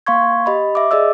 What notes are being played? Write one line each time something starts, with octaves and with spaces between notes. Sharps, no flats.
A#3 F5 C6 C#6 G#6
G4 D#5 B5
E5 D6
G#4 D5 D#5 E6